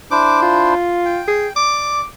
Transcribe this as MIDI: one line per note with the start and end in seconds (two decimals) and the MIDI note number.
0.11 0.74 62
0.11 0.74 64
0.11 0.74 72
0.11 0.38 86
0.42 1.21 65
1.06 1.53 79
1.28 1.48 68
1.56 2.01 74
1.56 2.05 86